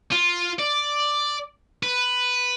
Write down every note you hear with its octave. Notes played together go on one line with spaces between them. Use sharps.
F4
D5
B4